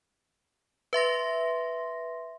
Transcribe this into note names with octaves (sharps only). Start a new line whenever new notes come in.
B4 E5 C6 A#6